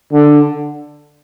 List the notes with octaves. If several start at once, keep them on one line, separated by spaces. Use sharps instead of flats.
D3